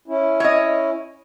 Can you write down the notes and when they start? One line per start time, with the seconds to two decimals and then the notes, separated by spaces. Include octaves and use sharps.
0.08 C#4 E4
0.40 C#5 D#5